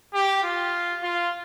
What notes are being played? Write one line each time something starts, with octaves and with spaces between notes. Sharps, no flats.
G4
F4
F4